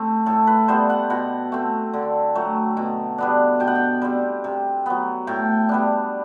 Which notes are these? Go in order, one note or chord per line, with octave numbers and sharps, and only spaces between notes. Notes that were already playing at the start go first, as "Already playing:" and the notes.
Already playing: A3 C4 G4
A2 A4
B4
G3 B3 C5
F#5
B2 F#5
A3 C4
D3
F#3 A3
B2
G3 B3 D4
B2 G5
F#5
G5
G3 C4
C3
F#3 B3
A2 G5
G3 B3 D4